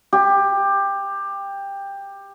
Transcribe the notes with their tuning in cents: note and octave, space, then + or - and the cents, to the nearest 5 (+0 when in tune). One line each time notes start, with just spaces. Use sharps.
G4 +15